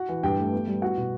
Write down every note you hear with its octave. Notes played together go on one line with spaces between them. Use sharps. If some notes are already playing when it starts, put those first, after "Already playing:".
Already playing: F#4 F#5
E3
G2 G4 G5
A3
B3
G3
B3 F#4 F#5
B2